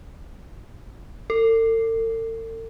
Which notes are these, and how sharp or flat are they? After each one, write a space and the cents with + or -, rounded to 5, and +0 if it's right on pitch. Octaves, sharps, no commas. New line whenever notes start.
A4 +45